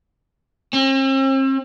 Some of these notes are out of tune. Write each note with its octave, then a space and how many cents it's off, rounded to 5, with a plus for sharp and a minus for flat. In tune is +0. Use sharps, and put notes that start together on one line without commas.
C4 +45